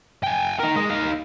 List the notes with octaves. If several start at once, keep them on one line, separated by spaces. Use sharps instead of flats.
G5 G#5
D#4 A#4
G#3 D#5
D#4 F5